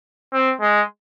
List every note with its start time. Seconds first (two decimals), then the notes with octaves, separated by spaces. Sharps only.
0.33 C4
0.61 G#3